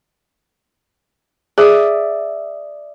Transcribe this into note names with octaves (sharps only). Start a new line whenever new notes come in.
G#4 D5 E5 D#6